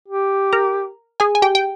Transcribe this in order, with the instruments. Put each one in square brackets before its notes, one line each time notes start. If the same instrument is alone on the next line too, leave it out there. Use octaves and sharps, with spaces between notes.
[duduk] G4
[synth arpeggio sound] A#4 A#5
G#4 G#5
G#5
G4 G5
G5